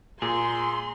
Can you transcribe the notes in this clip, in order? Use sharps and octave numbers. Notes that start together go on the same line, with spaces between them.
A#2 G#4 A#5 C6